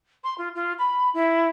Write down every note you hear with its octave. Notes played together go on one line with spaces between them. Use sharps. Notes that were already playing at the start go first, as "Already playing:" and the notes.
C6
F4
F4
B5
E4